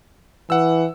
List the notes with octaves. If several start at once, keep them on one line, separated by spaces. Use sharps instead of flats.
E3 F#5 E6